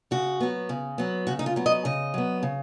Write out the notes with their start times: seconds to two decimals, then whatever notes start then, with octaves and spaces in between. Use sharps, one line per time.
0.11 C#3 F#4
0.41 F#3 B3
0.69 C#3
0.98 F#3 B3
1.27 C#3 F#4
1.39 D#4
1.46 F4
1.56 F#3 B3
1.66 D#5
1.85 C#3 D#5
2.14 F#3 B3
2.43 C#3